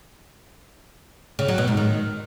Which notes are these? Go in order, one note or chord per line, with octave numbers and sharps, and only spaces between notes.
C#3
F#3
B2
G#2
D#3